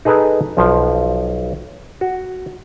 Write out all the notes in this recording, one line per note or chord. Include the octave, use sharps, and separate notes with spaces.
D#4 G#4 A4 B4 A#5
B1 F3
F#4